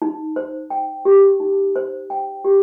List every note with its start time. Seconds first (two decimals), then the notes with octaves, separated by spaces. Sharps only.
0.02 D#4
0.36 C5
0.70 G5
1.05 G4
1.40 D#4
1.76 C5
2.10 G5
2.45 G4